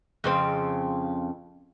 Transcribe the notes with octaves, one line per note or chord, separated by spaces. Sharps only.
F2 C#3 C4